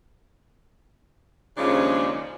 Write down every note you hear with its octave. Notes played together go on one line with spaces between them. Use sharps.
D#2 C#3 F3 G#3 C#4 D4